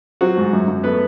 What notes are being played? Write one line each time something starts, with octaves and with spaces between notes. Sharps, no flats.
F#3 C4 F#4
G#2
F#2
F#2
A3 B3 B4